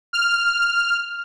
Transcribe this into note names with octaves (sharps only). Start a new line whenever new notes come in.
F6